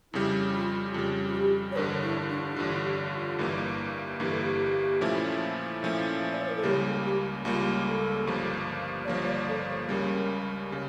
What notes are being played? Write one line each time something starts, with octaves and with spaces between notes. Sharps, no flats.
F2 C#3 G3 E4
F4
F2 C#3 G3 F4
F4
G4
C#5
A1 G2 D3 A#4
E4
D4
E4
A1 G2 D3 F4
G4
F4
G1 G2 E3 A#3
G1 G2 E3 A#3 G4
A4
G4
A#2 F3 A3 C#4 E4
A#2 F3 A3 C#4 E4
D5
C#5
A#4
A4
C#2 C#3 G3 A#3 G4
G4
C#2 C#3 G3 A#3 F4
A4
G1 G2 F3 A#3
D5
G1 G2 F3 A#3 C#5
C#5
D5
A4
C#5
C#2 C#3 G3 A#4
C#3